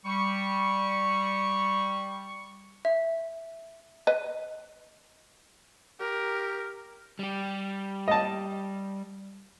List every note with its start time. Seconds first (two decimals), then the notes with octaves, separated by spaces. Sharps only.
0.05 G3 C#6
2.85 E5
4.07 B4 D#5
6.00 G4 A#4
7.19 G3 G4
8.08 D#5 A5